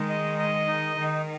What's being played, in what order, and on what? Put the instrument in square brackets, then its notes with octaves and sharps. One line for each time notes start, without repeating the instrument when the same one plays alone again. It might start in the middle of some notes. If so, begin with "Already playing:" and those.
Already playing: [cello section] D#3 G#3 [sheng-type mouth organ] D#4
[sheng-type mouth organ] D#5
D#5
D#4
[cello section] D#3 [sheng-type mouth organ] D#4